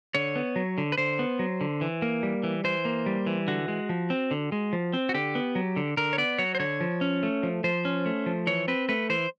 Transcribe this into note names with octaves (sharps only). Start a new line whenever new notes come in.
D3 C#5
B3
F#3
D3
B4
D3 C5
B3
F#3
D3
E3
A#3
G3
E3
E3 C5
A#3
G3
E3
D3 F#4
G#3
F3
C4
D3
G#3
F3
C4
F#4
D3 G4
B3
F#3
D3
D3 A#4
C#5
B3 D5
F#3 C#5
C5
D3 C#5
F3
C#4
A3
F3
F3 C5
C#4
A3
F3
E3 C#5
C4 B4
A3 B4
E3 C5